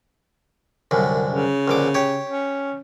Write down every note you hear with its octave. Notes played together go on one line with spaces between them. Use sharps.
C2 F#2 D3
C#3
A#1 D3 D6
G4 C#5 C#6
C#4